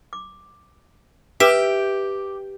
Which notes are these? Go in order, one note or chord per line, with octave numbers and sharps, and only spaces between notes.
D6
G4 B4 E5